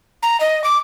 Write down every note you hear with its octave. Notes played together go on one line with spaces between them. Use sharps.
A#5
D#5
D6